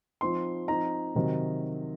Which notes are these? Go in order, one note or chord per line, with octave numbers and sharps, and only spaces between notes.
F3 C4 D#4 C6
F3 C4 D#4 A#5
C3 D#3 F#3 C4 D#4